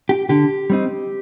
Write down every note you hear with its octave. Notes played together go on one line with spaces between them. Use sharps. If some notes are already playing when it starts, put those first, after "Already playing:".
G4
D3 G4
G3 C4 D#4